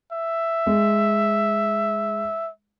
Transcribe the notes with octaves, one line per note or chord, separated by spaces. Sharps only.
E5
G#3